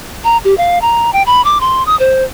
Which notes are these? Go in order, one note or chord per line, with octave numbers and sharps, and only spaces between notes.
A#5
G4
F5
A#5
G5
B5
D6
C6
D#6
C5